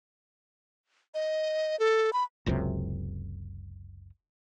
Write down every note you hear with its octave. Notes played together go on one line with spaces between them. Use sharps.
D#5
A4
B5
F#1 C#2 F#2 C3